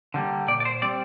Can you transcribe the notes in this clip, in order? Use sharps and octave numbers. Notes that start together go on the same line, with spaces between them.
D3 G3 A#3
A#2 D5
D5
C5
G3 C4 D5